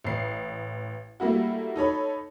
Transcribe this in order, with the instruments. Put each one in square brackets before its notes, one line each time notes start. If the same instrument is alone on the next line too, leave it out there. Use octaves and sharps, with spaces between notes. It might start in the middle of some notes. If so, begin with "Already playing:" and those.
[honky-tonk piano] A1 C7
G3 A3 A#3 E4 F#4
D#4 A4 C#5 B5